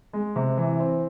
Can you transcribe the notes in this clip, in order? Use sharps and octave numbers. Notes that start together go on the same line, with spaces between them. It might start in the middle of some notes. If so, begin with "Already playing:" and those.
G#3
C3
E3
C4